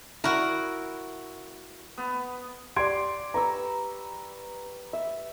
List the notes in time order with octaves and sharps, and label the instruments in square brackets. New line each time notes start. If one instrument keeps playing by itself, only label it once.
[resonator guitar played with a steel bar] E4 [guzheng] F#4 A#4
[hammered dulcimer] B3
[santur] G4 D5 [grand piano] C6 G#6 D7
[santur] B4 C#6 E6 [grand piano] A#5
[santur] E5